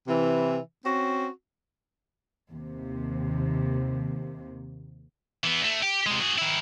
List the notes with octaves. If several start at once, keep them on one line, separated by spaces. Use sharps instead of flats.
C3 E3
C4 C#4 F#4
D#2 C3
E3 B3
D2 A3
G4
C3 G#3
F#4 G#4
D#3 E4